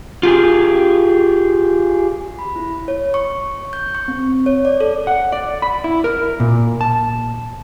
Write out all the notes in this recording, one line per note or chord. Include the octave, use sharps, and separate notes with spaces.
F4 G4 G#4
B5
E4
C#5
C#6
G6
C#6
C4
C#5
D5
A4
F#5
D5
B5
E4
A#4
A#2
A5